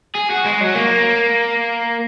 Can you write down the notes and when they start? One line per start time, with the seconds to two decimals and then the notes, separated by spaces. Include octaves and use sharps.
0.15 G#4
0.30 F#4
0.45 G#3
0.61 F#3
0.75 A#3